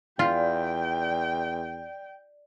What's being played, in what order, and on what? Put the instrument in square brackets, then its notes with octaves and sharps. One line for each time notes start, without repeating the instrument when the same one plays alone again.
[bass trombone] E2 [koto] F4 [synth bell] D5 [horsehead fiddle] G5